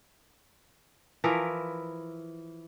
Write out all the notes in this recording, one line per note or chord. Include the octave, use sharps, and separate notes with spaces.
E3 F3 E4 A#4